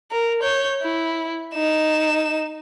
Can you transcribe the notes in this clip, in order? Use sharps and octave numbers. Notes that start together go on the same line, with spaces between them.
A#4
C#5 G6
E4
D#4 E7